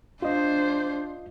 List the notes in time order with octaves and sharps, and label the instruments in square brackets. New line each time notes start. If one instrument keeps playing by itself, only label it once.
[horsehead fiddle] D4 C5 [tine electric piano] F4 D#5